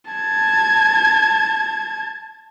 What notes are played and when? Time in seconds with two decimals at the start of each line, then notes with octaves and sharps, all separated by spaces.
0.11 A5 G#6